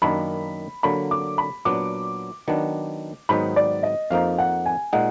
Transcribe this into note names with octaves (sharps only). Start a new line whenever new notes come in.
F#2 D#3 A#3 D4 B5
D3 F#3 A#3 B5
D6
B5
A#2 F#3 B3 D4 D6
D#3 F#3 B3 D4
G#2 D#3 F#3 B3 D#4 B5
D5
D#5
F2 F3 A#3 D#4 F5
F#5
G#5
A#2 G#3 D#4 F#5